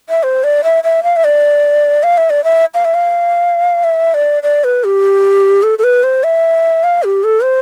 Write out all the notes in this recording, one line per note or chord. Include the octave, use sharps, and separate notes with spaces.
E5
C5
D5
E5
E5
F5
E5
D5
F5
E5
D5
E5
F5
E5
F5
E5
D5
D5
B4
G4
A4
A4
B4
C5
E5
F5
G4
A4
C5